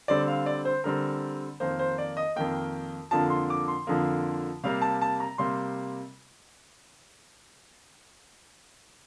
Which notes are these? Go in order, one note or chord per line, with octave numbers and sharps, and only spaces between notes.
D3 G3 C4 D5
F5
D5
C5
D3 G3 C4 A#4
F2 D#3 A#3 C5
C5
D5
D#5
F2 D#3 A#3 G5
F2 D3 F3 A#3 A5
C6
D6
C6
F2 D3 F3 A#3
C3 G3 A#3 F5
A5
A5
A#5
C3 G3 A#3 C6